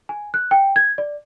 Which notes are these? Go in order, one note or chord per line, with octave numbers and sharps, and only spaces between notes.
G#5
F#6
G5
G#6
D5